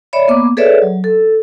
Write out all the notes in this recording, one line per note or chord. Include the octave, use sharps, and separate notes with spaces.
C#5 D5 E5 B5
A#3 B3 D6
G#4 A4 B4 C#5 D5 E5
F#3
A4